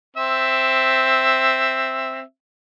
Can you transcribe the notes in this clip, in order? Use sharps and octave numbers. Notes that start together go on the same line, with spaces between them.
C4 E5